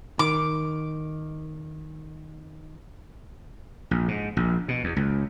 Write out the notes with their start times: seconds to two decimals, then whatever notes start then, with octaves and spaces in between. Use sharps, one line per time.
0.19 D#3 D6
3.91 A#1
4.08 G#2
4.37 A#1
4.68 B2
4.84 E2
4.96 C#2